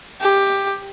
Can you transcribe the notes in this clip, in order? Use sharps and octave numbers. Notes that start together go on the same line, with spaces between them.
G4